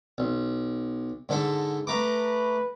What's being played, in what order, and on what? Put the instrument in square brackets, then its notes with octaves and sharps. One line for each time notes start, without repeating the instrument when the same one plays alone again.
[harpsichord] B1
G#2 D3 A4
[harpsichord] A3 A#5 D6 [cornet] B4